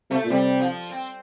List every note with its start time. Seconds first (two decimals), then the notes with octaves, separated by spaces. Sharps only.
0.10 C3 A3
0.24 A#2
0.30 C3 G3
0.60 F3
0.91 C4